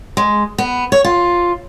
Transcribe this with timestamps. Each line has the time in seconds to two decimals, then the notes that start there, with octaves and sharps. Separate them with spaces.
0.17 G#3
0.58 B3
0.92 C#5
1.04 F4